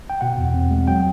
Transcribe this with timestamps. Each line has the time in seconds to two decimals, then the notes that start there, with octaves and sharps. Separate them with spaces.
0.10 G5
0.21 B2 F#5
0.38 E2
0.54 C4
0.71 G#3
0.88 F#3 G5